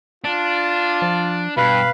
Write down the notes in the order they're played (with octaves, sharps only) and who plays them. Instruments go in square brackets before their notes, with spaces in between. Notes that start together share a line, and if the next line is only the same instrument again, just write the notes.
[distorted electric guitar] D4 [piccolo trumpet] F4
[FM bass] F3
[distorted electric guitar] G2 [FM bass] B2 [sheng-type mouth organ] B4 F5 B5